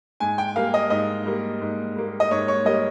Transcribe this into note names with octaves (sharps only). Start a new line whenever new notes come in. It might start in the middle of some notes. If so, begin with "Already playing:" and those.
G#2 G#5
G5
G3 A#3 F5
D#5
G#2 D#5
G3 A#3
G#2
G3 A#3
D#5
G#2 C#5
C#5
G3 A#3 D#5